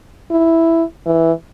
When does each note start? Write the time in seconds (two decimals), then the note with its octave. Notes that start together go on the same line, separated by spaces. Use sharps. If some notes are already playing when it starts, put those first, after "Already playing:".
0.31 E4
1.06 E3